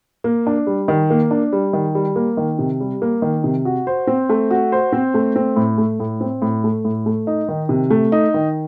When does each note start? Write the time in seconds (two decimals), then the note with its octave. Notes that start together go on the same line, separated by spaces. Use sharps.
0.24 A#3
0.47 D4
0.67 G3
0.88 D#3
1.10 A#3
1.31 D4
1.53 G3
1.73 D#3
1.95 G3
2.16 A#3
2.37 D#3
2.59 C3
2.80 G3
3.02 A#3
3.22 D#3
3.44 C3
3.65 F#4
3.87 C5
4.07 C4
4.29 A3
4.51 F#4
4.72 C5
4.93 C4
5.14 A3
5.36 C4
5.56 A2
5.78 A3
6.00 A2
6.21 C4
6.42 A2
6.64 A3
6.85 A2
7.06 A3
7.27 D#4
7.49 D#3
7.69 C3
7.90 A3
8.12 D#4
8.34 D#3